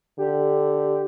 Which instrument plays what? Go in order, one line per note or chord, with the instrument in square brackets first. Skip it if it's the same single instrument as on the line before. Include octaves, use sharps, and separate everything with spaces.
[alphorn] D3 [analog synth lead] G4